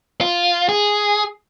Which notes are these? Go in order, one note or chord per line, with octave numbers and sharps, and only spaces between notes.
F4
G#4